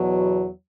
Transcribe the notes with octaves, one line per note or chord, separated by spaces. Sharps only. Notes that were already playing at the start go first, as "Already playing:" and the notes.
Already playing: E2 B2 F#3